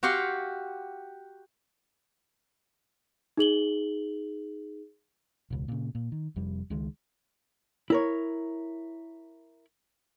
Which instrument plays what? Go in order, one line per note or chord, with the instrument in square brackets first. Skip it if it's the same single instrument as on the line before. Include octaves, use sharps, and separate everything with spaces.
[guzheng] F#4 G4 F5 F#5 C6
[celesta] D#4 G#4 F#7 G7
[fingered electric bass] E1 C#2
A#2 C#3
A#2
D#3
F1 F2 G3
C#2 D#3 G#3
[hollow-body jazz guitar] E4 A#4 C#5